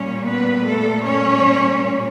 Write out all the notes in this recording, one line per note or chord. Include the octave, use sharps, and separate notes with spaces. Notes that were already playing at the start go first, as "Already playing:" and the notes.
Already playing: A#2 G3 A#3 C#4 C#5
B3 B4
A3 A4
C#4 C#5